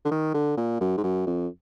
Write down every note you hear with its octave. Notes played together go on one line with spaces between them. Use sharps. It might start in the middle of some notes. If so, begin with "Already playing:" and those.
D3
D#3
D3
A#2
F#2
G#2
F#2
F2